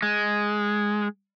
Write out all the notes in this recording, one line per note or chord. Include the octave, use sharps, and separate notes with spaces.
G#3